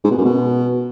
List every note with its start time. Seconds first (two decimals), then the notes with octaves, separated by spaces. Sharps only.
0.04 G#2
0.11 B2
0.18 F#2
0.25 B2